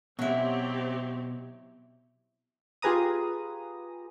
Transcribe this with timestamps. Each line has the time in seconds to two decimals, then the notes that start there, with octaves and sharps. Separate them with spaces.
0.19 B2 F#3 C4 E4 G4 C#5 E5
2.82 F4 G4 G#4 B4 A#5 D#6